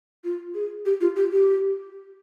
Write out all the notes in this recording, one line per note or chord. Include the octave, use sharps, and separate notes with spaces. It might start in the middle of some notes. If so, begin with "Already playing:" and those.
F4
G#4
G4
F4
G4
G4